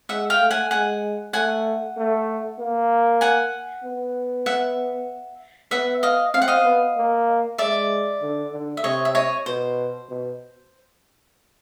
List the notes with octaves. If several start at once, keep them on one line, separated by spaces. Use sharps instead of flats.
G#3 E5 F#5
F5 G5
A3
F#5 G#5
G#3 F#5 G#5
A3 F#5 G#5
A3
A#3
F#5 G#5
B3
E5 F#5
B3 E5 F#5
D#5 F5
C4 F5
F#5
D#5 F5
B3
A#3
G#3 D5 E5
D3
D3
E5
C3 C#5 D#5
E5
C#5 D#5
B2 C5
B2